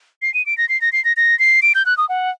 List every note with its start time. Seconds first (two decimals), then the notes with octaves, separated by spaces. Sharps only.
0.22 C7
0.34 D#7
0.46 D7
0.58 A#6
0.69 C7
0.81 A#6
0.93 C7
1.05 A#6
1.17 A#6
1.39 C7
1.62 D7
1.75 G6
1.86 F#6
1.98 D#6
2.09 F#5